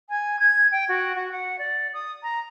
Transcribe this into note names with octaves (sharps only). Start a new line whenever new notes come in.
G#5
G#6
G5
F#4
F#4
F#5
D5
D#6
A#5